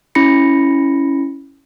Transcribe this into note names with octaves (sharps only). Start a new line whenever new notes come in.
C#4 E4 B5 A#6 C#7